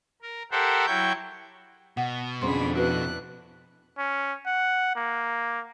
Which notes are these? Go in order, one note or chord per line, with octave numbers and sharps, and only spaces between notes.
A#4
G4 A4 A#4 C5 E5 F#5
F#3 E4 G5 C#6 G6
B2 F#5
F2 D3 C#4 G#4 C5 B5 C6
D4 E4 F#4 B4 F#6
C#4
F#5
A#3